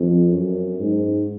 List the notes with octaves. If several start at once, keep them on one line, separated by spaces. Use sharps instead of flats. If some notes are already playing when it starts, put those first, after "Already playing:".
Already playing: F2
F#2
G#2